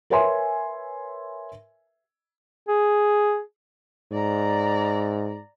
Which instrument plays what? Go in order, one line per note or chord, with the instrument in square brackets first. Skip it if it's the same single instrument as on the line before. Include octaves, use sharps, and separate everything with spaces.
[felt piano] A#4 B4 C#5 E5 G#5 C6
[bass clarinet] G#4
[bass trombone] G#2 [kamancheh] D5 A#5